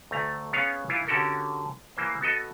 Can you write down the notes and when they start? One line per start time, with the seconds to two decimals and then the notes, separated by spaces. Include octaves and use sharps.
0.11 D2 A3 A#5
0.53 B3 C#4 G#4 C#5 F5
0.89 E3 E4 F4
1.07 D3 C#4 F#4 G4 A4 A#4
1.97 E3 A#3 C5
2.21 B3 F#4 A4 D#5